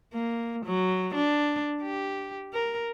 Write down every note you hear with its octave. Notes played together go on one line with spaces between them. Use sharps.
A#3
F#3
D4
G4
A#4